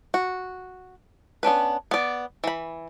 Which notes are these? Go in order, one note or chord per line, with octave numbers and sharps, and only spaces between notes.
F#4
B3 C#4 D4 B4
B3 D5
E3 B5